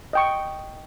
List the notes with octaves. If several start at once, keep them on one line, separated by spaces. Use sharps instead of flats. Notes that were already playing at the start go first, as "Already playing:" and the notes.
D#5 G5 C#6